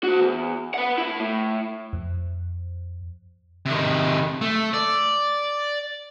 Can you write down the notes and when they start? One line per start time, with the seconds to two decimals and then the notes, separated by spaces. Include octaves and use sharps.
0.04 F#4 C5
0.18 E2
0.74 B4 F#5
0.98 A2 E4
1.19 A2
1.93 F2
3.66 C3 D#3
4.41 A3
4.73 D5